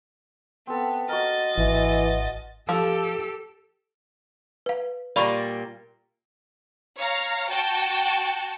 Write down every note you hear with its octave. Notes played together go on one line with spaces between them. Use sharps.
B3 C4 A4
F#4 A#4 D#5 A6
G#1 E3
F3 G4 A4
B4 F5
A#2 G3 A#3 D5 B5 C#6
C#5 F5 A#5
F#4 G5 A5